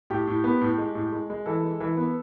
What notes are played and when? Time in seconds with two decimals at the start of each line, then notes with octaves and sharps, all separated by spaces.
0.10 A2 G4
0.27 A2
0.44 B3
0.61 A2
0.78 G#3
0.95 A2
1.12 G#3
1.30 G#3
1.46 E3 A4
1.63 G#3
1.80 E3
1.97 B3